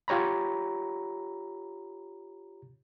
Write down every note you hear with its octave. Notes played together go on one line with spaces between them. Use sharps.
F4 G4 C#5 A#5 B5